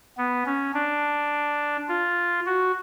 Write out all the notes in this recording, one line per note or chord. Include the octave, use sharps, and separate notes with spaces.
B3
C#4
D4
F4
F#4